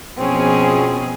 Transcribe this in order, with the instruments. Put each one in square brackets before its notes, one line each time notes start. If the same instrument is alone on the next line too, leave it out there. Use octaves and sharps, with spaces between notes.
[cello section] B2 F3 G#4 [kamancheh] C4 C#4